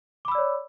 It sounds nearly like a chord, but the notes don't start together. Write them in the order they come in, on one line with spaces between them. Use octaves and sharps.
D6 B5 E6 D5 C#5